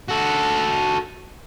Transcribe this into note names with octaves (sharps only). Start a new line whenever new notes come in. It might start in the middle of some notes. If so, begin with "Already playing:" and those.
F#4 A4